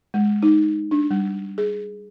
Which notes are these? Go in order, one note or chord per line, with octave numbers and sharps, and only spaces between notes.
G#3
D#4
D4
G3
G#4